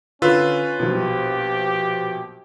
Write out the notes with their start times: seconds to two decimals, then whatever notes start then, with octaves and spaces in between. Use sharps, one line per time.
0.22 D3 C#4 F4 B4 E6
0.80 A#1 B2 G4